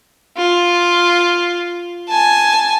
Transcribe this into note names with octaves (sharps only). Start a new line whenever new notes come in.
F4
G#5 A5